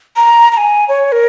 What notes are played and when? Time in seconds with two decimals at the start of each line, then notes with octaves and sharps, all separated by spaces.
0.16 A#5
0.52 A#5
0.57 G#5
0.89 C#5
1.12 A#4